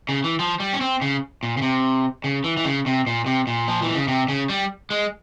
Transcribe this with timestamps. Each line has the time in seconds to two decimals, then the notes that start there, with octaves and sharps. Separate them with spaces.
0.09 C#3
0.24 E3
0.39 F3
0.60 G3
0.73 C#4
0.81 C4
1.02 C#3
1.43 A#2
1.57 C#3
1.62 C3
2.24 C#3
2.44 E3
2.57 E3
2.65 C#3
2.86 C3
3.07 A#2
3.26 C3
3.47 A#2
3.68 F3
3.82 E3
3.95 C#3
4.08 C3
4.28 C#3
4.49 G3
4.90 G#3